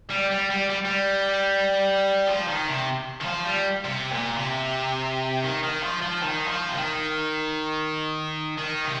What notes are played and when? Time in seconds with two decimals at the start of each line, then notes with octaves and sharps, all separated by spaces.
0.10 G3
0.31 G3
0.50 G3
0.70 G3
0.85 G3
2.27 F3
2.48 D#3
2.67 C3
3.21 D#3
3.25 F3
3.45 G3
3.85 C3
4.12 A#2
4.37 C3
5.44 D#3
5.63 D#3
5.83 F3
6.02 F3
6.22 D#3
6.48 F3
6.69 C3
6.75 D#3
8.58 D#3
8.85 C3